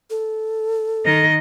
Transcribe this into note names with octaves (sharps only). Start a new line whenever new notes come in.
A4
D#3 D#5